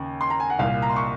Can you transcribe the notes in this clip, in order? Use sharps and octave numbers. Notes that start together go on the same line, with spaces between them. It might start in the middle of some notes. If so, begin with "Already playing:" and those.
Already playing: D#2 C#3
C6
A#5
G#5
F#5
C2 A#2 F5
A#5
C6
C#6